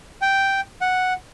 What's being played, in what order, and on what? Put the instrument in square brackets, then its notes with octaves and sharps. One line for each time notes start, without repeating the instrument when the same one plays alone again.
[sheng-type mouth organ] G5
F#5